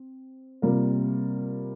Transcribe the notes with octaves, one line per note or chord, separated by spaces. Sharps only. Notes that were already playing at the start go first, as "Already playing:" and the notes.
Already playing: C4
C3 G3 A#3 F4 A#4